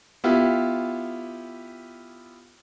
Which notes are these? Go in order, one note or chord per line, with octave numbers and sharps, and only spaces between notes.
B3 E4 F4 G4